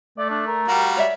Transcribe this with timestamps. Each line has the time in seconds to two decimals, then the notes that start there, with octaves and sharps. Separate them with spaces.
0.18 A3 D5
0.30 D4
0.47 A#4
0.68 G3 F#4 G4 F5 A#5
0.97 C#5 D5 E5